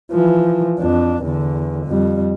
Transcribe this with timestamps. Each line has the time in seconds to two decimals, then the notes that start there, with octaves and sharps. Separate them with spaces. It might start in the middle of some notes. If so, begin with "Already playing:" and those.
0.12 E3 F3
0.79 F2 D4
1.23 E2 D3
1.87 F2 G3